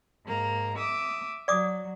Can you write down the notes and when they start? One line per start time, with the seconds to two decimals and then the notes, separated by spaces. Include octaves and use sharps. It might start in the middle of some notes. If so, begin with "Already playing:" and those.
0.24 G#2 A#3 A#5
0.77 E5 D6 D#6
1.48 F#3 D5 D6 D#6